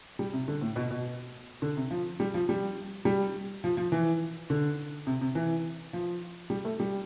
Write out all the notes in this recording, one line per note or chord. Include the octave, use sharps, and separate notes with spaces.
G3
C3
D3
A2
B2
B2
D3
C3
F3
G3
F3
G3
G3
F3
F3
E3
D3
C3
C3
E3
F3
G3
A3
G3